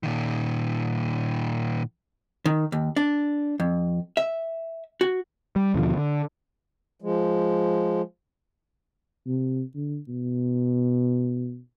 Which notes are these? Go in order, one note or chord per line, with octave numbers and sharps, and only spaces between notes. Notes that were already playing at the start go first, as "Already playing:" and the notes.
A#2 D#3
D#3
D#2
D4
F2
E5
F#4
G3
D#2 B2 D3 F3
D3
F3 G#3
C3
D3
B2